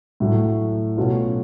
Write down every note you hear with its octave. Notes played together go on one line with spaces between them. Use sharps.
A2 F#3 A3
B2 F#3 A3 C#4 F4